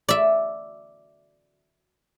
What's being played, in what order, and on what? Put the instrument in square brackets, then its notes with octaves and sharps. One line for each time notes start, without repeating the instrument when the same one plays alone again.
[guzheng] D5 E5